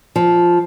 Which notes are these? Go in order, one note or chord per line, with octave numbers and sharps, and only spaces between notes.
F3